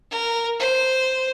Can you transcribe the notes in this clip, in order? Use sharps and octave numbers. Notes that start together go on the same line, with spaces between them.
A#4
C5